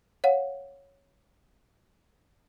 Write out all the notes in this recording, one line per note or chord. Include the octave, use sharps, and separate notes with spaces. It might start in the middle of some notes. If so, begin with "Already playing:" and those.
C#5 F5 F#5